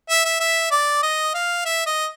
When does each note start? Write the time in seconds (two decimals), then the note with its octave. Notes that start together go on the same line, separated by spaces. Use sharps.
0.10 E5
0.25 E5
0.40 E5
0.71 D5
1.03 D#5
1.34 F5
1.65 E5
1.86 D#5